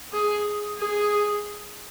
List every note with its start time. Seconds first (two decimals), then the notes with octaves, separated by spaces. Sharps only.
0.13 G#4
0.78 G#4